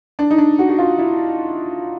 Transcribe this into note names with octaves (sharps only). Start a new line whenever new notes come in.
D4
D#4
D4
F#4
F#4
F4
E4